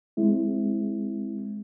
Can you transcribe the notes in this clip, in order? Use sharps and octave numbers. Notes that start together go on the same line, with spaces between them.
G#3 C4 E4